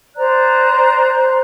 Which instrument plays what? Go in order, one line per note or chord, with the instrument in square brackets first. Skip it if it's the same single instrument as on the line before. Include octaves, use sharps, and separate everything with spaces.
[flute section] C5 D5 A#5 F#6